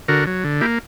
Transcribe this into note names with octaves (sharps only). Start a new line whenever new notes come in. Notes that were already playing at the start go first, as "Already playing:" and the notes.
D3 F#4 A#4
F#3
D3
A#3 E4 G4